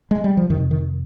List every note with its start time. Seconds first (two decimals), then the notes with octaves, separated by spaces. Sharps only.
0.11 G#3
0.24 G3
0.37 F3
0.50 F2 D#3
0.53 C3
0.71 D#3